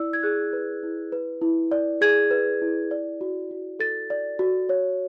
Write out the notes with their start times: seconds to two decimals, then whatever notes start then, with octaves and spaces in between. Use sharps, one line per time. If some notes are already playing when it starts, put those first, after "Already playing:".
Already playing: E4 D5 E6
0.13 G#6
0.23 G#4 F#6
0.53 B4
0.83 E4
1.12 B4
1.42 E4
1.71 D5
2.01 G#4 G#6
2.31 B4
2.62 E4
2.91 D5
3.21 F#4
3.51 F#4
3.79 A4 A6
4.10 D5
4.39 F#4
4.69 C#5